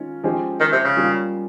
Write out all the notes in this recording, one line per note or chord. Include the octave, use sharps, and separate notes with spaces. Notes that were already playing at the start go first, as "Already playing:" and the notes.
Already playing: D#3 G#3 C#4 F4
F3 G#3 C#4 G4 C5
D#3
C3
C#3
G3 A#3 C#4 F4